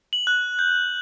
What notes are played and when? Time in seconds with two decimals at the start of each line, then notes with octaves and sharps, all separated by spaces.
0.13 F#7
0.27 F#6
0.59 G6